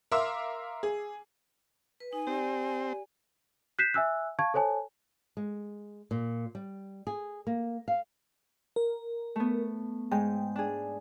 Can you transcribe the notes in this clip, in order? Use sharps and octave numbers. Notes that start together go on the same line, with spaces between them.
A#4 E5 F5 C6 D6 E6
G#4
B4
D#4 G#5
C4 G4 D5
F#6 G6 B6 C7 E7
E5 G#5 E6 F#6
F5 A5 C#6 G#6
A4 C5 C#5 G#5 A5
G#3
A#2
G3
G#4
A#3
F5
A#4
A3 B3
G#2 G#3 G5
D4 G#4